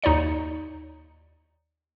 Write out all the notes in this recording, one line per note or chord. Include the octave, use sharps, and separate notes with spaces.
D#2 D#4 C#5 D5 C#7